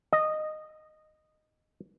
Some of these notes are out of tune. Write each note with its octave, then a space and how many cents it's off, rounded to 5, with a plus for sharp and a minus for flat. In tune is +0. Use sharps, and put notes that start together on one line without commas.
D#5 -10